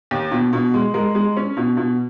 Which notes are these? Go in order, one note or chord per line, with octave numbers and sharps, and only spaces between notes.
D#2
B2
B2
G#3
G#3 A#4
G#3
C#4
B2
B2